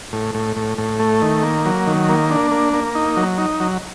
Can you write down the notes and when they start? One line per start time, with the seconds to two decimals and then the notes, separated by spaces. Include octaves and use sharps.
0.13 A2
0.35 A2
0.57 A2
0.78 A2
1.00 A3
1.22 D#3
1.43 A#3
1.65 F#3
1.87 D#3
2.09 A#3
2.31 D4
2.51 A#3
2.73 A#3
2.95 D#4
3.17 F#3
3.38 D#4
3.60 F#3